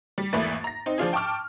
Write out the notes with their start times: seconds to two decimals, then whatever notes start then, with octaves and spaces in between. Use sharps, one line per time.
0.18 G3
0.33 G#1 E2 A3 A#3 B4 A6
0.64 A#5 A#6
0.86 C4 D#4
0.98 F3 D4 F4 G#4
1.13 G5 A5 C#6 D6 F6